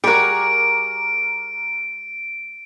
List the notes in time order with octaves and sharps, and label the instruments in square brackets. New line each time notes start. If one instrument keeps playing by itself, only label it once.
[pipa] G3 F#4 [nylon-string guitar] G#4 [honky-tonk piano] A#4 D6 [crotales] D7